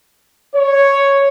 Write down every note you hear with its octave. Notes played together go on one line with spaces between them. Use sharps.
C#5